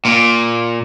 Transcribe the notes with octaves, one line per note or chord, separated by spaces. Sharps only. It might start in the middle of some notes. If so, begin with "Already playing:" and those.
A#2